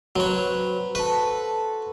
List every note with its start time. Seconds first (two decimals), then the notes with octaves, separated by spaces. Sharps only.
0.16 F#3 C4 B4 C#5
0.95 F#4 A4 B4